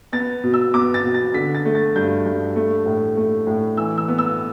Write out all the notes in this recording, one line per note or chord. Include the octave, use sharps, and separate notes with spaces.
B3 A6
B2
E6
B3 D6
A6
B2
A6
D3 B6
A6
A3
A6
G2 G6
G2
A3
A2
A3
A2
E3 E6
E6
B3
E6